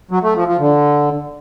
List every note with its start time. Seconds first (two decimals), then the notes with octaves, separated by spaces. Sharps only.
0.11 F#3
0.23 A3
0.35 F3
0.47 F3
0.59 D3